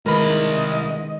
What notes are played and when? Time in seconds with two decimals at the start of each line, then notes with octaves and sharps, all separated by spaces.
0.06 C2 D#3 G#3 A#4 B4 D#5 B5